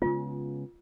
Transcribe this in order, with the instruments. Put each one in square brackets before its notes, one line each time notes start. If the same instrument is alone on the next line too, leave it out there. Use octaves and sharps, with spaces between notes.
[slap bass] C#3 G#3 B3 [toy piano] F4